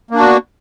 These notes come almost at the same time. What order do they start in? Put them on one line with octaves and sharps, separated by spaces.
A#3 D4 F#4 B3